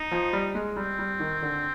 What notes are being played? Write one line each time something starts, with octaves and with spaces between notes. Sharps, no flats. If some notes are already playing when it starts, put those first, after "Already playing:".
Already playing: D#4
F3
G3
G#3
G3 C4
G3
D#3
D3